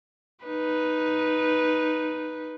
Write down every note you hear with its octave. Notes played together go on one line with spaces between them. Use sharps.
D#4 B4